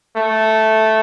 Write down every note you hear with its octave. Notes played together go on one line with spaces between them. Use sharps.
A3